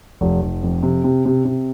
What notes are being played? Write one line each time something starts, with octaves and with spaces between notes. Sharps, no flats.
F1
F1
F2
C3
C3
C3
C3